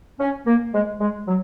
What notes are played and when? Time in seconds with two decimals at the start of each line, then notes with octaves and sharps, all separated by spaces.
0.20 C#4
0.47 A#3
0.74 G#3
1.01 G#3
1.28 F#3